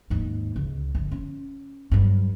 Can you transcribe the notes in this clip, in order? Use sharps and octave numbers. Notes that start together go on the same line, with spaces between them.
D#2 G#2
C#2
G1
C#4
G2 F#3